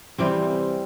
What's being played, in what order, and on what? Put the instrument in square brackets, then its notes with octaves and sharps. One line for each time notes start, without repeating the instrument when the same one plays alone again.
[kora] C3 E3 G3 C4